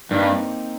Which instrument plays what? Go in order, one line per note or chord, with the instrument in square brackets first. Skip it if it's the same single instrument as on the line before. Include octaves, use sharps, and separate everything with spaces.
[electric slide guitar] G2 [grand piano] A#3 D#4
[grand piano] C4